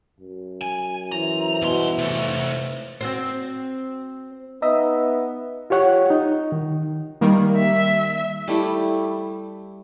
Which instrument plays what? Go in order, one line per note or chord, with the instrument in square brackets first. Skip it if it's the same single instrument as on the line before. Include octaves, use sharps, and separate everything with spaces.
[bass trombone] F#2
[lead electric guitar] G#5
[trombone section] E3 E4 C5 [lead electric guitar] A#5
[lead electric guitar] G2 C6 [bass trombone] B2
[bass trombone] A2 [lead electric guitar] C3 A3
[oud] C4 F#4 C5
[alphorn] B3 [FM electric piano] D#4 D#5 E5
[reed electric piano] F4 G4 C#5 F#5
D#4
D#3
[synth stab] D#3 G3 A#3
[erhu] E5
[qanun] G3 A3 E4 G4